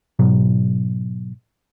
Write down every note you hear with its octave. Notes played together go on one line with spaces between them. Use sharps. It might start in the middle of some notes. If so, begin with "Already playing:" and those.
G#2 B2 F#3